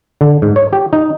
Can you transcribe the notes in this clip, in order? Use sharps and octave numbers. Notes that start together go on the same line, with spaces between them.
D3
G#2
C#5
G4
D#4